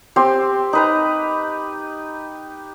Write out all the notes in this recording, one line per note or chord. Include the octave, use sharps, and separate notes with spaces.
C4 G4 C6
D#4 B4 A#5